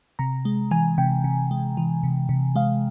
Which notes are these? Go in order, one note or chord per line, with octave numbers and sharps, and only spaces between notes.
C3 A#5
G#3
E3 G#5
C3 G5
C3
G#3
E3
C3
C3
G#3 F5